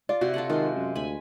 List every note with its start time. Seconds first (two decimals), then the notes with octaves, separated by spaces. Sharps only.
0.09 F4 D5
0.21 C3 E4 F#4 C6
0.34 F4 A4 F#5
0.50 D#3 G#3 F4 C6
0.77 F#2
0.95 D2 G#5 B5